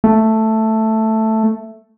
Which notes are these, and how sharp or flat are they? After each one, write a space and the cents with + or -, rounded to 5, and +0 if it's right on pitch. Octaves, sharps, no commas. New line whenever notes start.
A3 +5